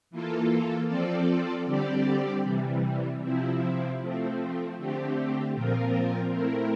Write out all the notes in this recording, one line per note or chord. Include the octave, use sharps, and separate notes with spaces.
E3 A#3 F4 A4
F3 C4 F4 A4 D5
D3 G3 C4 G4 D5
C3 E3 G3
C3 F3 C4 E4
F3 A3 C4
D3 A3 C4 G4
A#2 F3 C4 F4 A#4
A3 C4 E4 A#4